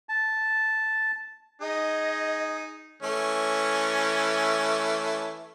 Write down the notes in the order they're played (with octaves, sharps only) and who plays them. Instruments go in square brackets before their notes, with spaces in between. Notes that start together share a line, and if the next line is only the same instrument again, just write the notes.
[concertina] A5
[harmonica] D#4 G#4 [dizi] D#5
[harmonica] E3 A3 C#4